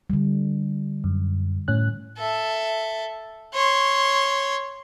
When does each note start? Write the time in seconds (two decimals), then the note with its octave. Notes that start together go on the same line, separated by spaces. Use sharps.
0.10 D3 G3
1.04 F#2
1.68 A2 C#4 F#6
2.18 A4 E5
3.54 C#5 C6